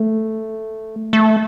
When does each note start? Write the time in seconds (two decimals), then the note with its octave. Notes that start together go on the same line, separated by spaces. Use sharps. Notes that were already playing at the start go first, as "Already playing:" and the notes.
Already playing: A3
1.13 A3